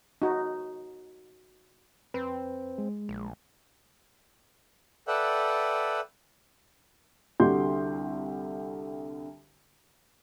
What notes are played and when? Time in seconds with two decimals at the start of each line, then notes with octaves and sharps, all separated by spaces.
0.22 D#4 F#4
2.14 F2 C4 B4
2.78 G#3
3.09 A#1
5.08 A4 B4 D5 E5 F#5 G5
7.40 C2 D3 F#4 G4 C6 G6